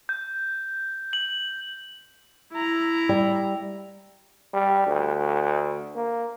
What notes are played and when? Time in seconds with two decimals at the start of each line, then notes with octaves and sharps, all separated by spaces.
0.09 G6
1.13 F#7
2.53 E4 A#5
3.09 G3
4.54 G3
4.87 D2
5.96 A#3